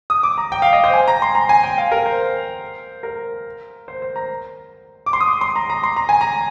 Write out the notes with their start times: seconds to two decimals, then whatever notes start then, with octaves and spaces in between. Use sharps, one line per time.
0.10 D#6
0.23 D6
0.38 A#5
0.52 G5
0.62 F5
0.73 D#5
0.84 C5
0.94 G#5
1.08 A#5
1.22 C6
1.35 A#5
1.49 G#5
1.63 G5
1.78 F5
1.91 A#4
2.06 C5
3.03 A#4
3.88 C5
4.02 C5
4.16 A#5
5.06 D6
5.13 C6
5.21 D#6
5.27 D6
5.41 C6
5.56 A#5
5.70 A#5
5.84 C6
5.97 A#5
6.09 G#5
6.21 A#5